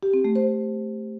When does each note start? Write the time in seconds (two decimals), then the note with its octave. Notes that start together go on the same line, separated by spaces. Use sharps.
0.03 G4
0.14 C4
0.24 A3
0.35 C5